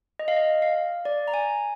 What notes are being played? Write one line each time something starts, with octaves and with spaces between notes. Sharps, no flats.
D#5
F5
D#5
F5
D5
A#5
G#5